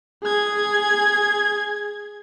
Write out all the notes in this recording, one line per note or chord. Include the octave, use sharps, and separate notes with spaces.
G#4 G#6